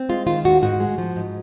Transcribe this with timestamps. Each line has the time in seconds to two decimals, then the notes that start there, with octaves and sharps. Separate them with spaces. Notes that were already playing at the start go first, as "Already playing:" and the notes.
Already playing: C4
0.09 G#3 F4
0.27 D#3 F4
0.45 D#2 F#4
0.62 G#2 F#4
0.80 G#3
0.98 F3
1.16 G#2